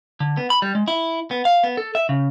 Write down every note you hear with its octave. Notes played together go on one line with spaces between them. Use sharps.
D3
B3
B5
G3
G#3
E4
B3
F5
B3
A4
E5
C#3